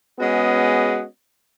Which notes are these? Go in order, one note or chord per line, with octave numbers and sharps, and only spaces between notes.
G#3 B3 C#4 F#4 G#4 D#5